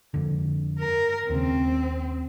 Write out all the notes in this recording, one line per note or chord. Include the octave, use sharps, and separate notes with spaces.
F2 D3
A#4
D#2 C#3 C4